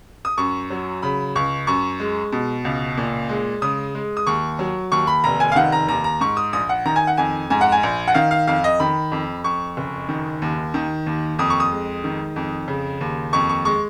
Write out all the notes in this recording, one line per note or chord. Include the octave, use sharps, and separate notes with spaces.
D#6
F#2 C#6
F#3
C#3 B5
C#2 C#6
F#2 C#6
G#3
B2
C#2
A#2
G#3
C#3 D#6
G#3
D#6
D#2 C#6
F#3
D#2 C#6
B5
F1 A#5
G#5
F5
D#3 F#5
A#5
D#2 A#5
A#5
G#2 C#6
D#6
A#1 D#6
F#5
D#3 A#5
G#5
F#5
F2 G#5
G#2 G#5
F#5
G#5
A#1
F#5
D#3 F5
F5
F2 F5
D#5
D#3 B5
F2
F2 C#6
F#1
D#3
D#2
D#3
D#2
F2 D#6
C#6
D#6
G#3
D#3
F2
C#3
D#2
F2 C#6
C#6
G#3 C#6